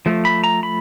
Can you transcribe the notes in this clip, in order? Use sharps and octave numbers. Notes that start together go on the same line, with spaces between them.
F3 A3
B5
A#5
B5